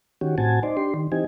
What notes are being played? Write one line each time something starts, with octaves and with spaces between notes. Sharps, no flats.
D#3 C#4 F#4 G4
A2 C4 F#4 G#5 A5
D#4 C5 D5
D4 G4 C6
D#3
E3 C4 D#4 G4 G#5